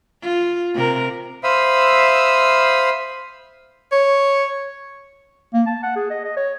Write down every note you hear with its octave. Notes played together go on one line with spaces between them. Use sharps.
F4
C3 A#4
C5 E5 F5 B5 D#6 E6
C#5
A#3
A5
F#5
G#4
D#5
D#5
C#5